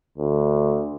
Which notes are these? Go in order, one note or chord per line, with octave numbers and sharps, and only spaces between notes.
D2